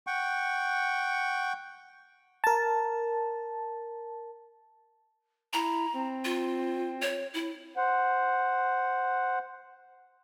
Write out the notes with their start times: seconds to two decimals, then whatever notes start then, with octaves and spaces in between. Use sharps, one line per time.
0.07 F#5 G5 C#6
2.44 A#4 A5
5.53 E4 A#5
5.93 C4
6.25 F4
7.02 C#5
7.34 E4
7.77 C5 F#5